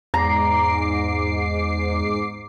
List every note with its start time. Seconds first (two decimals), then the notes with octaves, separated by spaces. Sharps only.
0.14 E2 G#2 A#5 D6 C7